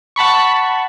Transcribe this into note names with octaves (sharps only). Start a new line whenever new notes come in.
F#5 A5 B5 C#6